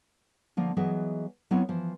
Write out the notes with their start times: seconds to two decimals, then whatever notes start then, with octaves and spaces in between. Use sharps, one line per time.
0.57 D3 F3 A#3
0.76 E3 F#3 B3 G#4 D#5 E5
1.51 F#3 B3 C4 E4 A#4 C#5
1.69 E3 F3 C5